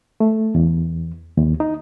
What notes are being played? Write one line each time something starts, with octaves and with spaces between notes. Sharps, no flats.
A3
E2
D#2
D#4